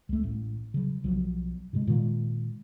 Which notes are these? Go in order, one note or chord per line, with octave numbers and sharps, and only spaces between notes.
C#2 A3
A1
C#3 F#3
B1 F3 F#3
G#2 C3 G#3
A#2 D#3 G#3